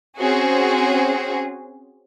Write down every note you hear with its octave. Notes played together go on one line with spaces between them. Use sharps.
C4 C#4 F#4 G#4